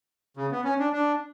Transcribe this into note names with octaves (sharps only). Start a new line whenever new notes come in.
C#3
B3
C#4
D4
D4